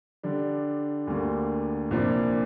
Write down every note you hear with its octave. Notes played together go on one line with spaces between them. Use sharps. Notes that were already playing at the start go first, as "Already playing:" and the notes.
D3 G3 D4
D2 D3 G3 A#3
C2 A#2 F3 A#3 D4